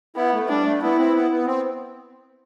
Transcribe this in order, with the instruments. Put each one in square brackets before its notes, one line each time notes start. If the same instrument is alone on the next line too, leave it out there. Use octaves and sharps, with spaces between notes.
[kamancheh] B3 [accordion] E4
[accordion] A3
[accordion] G3 [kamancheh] D4
[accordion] A3
[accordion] B3 [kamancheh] E4
[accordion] C4
B3
B3
C4